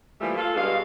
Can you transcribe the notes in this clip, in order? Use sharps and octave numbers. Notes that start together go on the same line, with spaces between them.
E3 F3 G3 A3 A#3
F4 A4
G2 B2 G#3 F5